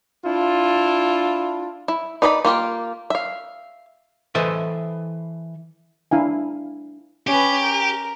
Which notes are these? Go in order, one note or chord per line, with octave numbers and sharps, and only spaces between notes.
D4 E4 F4
E4
D#4 B4 D5 D#5 B5
A#3 F4 G4
E5 F5
E3 A4 B4 C5 D#5 E5
D4 E4 F5 G#5
C#4 G4 B4
A#4